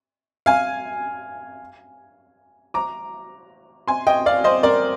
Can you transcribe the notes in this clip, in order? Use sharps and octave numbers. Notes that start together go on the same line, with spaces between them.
F5 G#5
A#5 D6
G#5 C6
D#5 G5
D5 F5
C5 D#5
A#4 D5